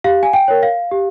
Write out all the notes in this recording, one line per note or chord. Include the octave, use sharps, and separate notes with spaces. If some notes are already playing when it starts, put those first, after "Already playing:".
G4 F5
G#5
G5
A#4 C#5
F5
G4